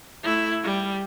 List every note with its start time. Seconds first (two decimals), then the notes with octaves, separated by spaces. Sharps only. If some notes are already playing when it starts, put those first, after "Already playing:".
0.23 A3 E4
0.63 G3